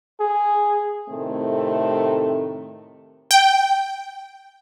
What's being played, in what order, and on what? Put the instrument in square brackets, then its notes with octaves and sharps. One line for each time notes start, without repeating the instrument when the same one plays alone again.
[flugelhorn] G#4
[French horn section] A2 C3 D#3 A3 C4
[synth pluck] G5